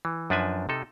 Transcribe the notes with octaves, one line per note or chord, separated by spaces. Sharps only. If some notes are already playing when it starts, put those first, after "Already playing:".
E3
F#2 F3 D4 B4 E5 G#5
C3 D#4 A4